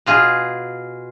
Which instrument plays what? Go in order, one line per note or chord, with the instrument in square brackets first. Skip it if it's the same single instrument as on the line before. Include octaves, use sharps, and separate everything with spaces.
[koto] B2 F4 G#4